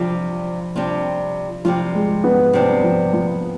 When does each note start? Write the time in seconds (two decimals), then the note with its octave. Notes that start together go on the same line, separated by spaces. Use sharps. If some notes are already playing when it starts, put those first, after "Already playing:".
Already playing: C3 F3 G3 D4 F4
0.76 C3 G3 D4 F4
1.65 C3 F3 G3 D4 F4
1.94 G#3
2.24 B3
2.53 C3 G3 C4 D4 F4
2.84 F3
3.13 F3